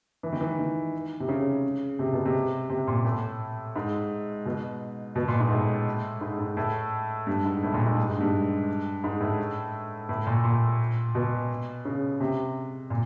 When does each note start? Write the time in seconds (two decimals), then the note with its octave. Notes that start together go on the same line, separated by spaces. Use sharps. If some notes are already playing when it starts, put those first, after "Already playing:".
0.23 E3
0.33 D#3
0.41 E3
0.59 D#3
1.20 C3
1.29 C#3
1.99 C3
2.13 B2
2.25 C3
2.70 C3
2.87 A#2
3.05 A2
3.76 G#2
4.46 B2
5.16 B2
5.28 A#2
5.40 G#2
5.51 A2
6.21 G#2
6.39 G#2
6.57 A2
7.27 G2
7.45 G#2
7.63 A2
7.74 A#2
7.86 G#2
7.98 G2
8.09 G#2
8.21 G2
9.04 G#2
9.20 A2
10.09 A2
10.27 A#2
10.44 A#2
11.15 B2
11.85 C#3
12.20 C3
12.90 A#2